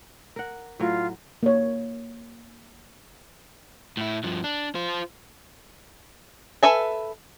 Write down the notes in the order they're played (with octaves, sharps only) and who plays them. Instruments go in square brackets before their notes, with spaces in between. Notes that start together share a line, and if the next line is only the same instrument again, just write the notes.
[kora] A#4 F#5
[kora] A2 F#3 [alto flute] F4
[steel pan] A#3 C#5
[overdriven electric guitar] A2 E4
G2 F3
D4
F4 C5
[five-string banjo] A4 B4 E5 G#5